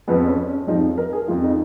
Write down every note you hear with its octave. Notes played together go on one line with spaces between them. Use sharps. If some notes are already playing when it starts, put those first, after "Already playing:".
F2 F3 G#3 B3
C#4
C#4
F2 F3 G#3 D#4
A#4
G#4
F2 F3 G#3 F4
D#4